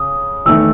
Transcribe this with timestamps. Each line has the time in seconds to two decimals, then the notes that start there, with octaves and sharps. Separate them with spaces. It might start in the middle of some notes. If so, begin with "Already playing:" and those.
Already playing: C#3 D#6
0.46 E2 D#3 A3 E6